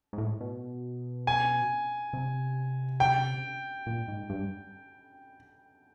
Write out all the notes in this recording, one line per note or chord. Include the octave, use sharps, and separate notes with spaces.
G#2
A2
B2
G#5
C3
G5
A#2
G#2
G2